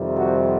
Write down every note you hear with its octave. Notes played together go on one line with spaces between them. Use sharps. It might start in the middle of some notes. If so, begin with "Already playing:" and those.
Already playing: F2 C3 D#3 G3
F#4